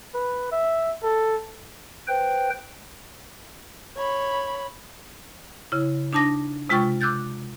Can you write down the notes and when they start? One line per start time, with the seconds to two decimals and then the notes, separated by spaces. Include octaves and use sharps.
0.14 B4
0.52 E5
1.03 A4
2.08 B4 C5 G5
3.97 C#5 B5
5.72 C#3 E4
6.13 D4 D#4 A5 D6 A#6
6.69 C3 G#3 F4 G5 C#6 A6
7.01 D6 E6 F#6 G6 A6